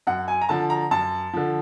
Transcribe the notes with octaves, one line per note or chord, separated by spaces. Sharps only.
F#2 F#5
G#5
A#5
D3 F3 A5
A#5
F#2 A5
D3 F3